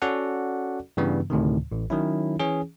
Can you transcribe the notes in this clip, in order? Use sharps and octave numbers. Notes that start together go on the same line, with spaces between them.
C#4 F#4 A4 D5 F#5
G2 C#3 E3 G3 B3
D2 A2 C3 D#3
A1
D#3 F#3 C#4 E4
E3 C#4 G#4